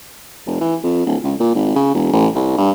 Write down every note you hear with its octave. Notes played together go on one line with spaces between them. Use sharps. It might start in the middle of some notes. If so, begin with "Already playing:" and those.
F1
E3
F2
D1
C#2
A#2
G#1
C#3
E1
A1
C2
G2